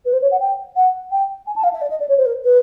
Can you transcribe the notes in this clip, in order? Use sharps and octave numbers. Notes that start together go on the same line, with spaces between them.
B4
C5
C#5
F#5
G5
F#5
G5
G#5
A5
F5
E5
D5
D#5
D5
C#5
C5
A#4
B4